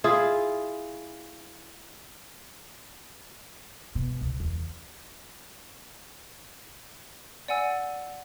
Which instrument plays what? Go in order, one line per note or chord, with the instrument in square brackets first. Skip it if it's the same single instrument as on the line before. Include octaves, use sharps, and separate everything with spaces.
[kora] E4 F4 G#4
[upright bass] B2
C#2
E2
[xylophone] D5 F#5 G#5 E6